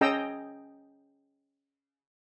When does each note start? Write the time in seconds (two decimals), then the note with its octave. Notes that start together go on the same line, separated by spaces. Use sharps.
0.01 C#4 G#4 D#5 G5 A#5 E6